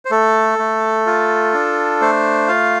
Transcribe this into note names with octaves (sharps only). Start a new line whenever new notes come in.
C5
A3 A4
A3
F4
D4
A3 C5
F4 F5